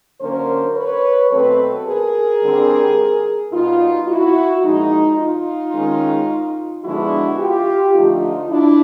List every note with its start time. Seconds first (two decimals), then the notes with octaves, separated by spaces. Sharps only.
0.20 D3 F#3 A#3 C#4 A#4 C5
0.76 B4 C#5
1.31 B2 F#3 A3 C4 A4 B4
1.86 G#4 A#4
2.42 D3 G3 C4
3.52 B2 G3 B3 D#4 F4
4.07 E4 F#4
4.63 A#2 F3 G#3 D#4
5.18 D#4 F4
5.73 D#3 G#3 C#4
6.84 D3 F3 G#3 B3 D4 E4 F#4
7.39 F4 G4
7.94 D3 F3 A3 D#4 F4
8.50 D4 E4